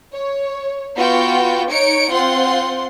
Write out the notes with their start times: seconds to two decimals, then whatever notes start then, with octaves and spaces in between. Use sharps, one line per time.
0.12 C#5
0.95 B3 F4 F#4 G5
1.70 D#4 C#5 C#7 D7
2.11 C4 F4 F#5 C6